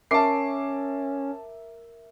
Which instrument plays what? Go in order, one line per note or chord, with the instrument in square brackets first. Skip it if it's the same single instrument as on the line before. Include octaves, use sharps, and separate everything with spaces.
[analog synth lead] C#4 [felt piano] A#4 E5 D6 [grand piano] A5 C7